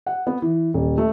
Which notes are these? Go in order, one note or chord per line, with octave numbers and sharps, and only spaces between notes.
F#5
B3
E3
D#1
A3